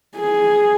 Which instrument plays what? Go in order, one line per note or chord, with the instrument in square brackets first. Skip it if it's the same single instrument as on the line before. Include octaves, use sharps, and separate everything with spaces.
[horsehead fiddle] G#4